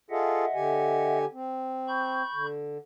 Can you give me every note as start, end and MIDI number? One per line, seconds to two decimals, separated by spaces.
0.10 0.45 65
0.10 0.45 68
0.10 0.45 69
0.10 1.18 75
0.10 1.18 76
0.10 1.18 78
0.55 1.25 50
0.55 1.25 67
0.55 1.25 80
1.33 2.23 60
1.88 2.46 83
1.88 2.46 85
1.88 2.46 91
2.34 2.78 50